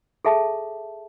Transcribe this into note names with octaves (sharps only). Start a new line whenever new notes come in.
G#4 A4 E5 A5